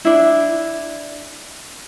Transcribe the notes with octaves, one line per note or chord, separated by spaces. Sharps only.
D4 E4